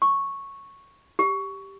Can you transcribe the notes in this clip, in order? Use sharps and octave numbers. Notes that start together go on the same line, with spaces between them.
C#6
G4